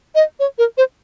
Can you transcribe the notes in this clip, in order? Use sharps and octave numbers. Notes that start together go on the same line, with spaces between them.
D#5
C#5
A#4
C5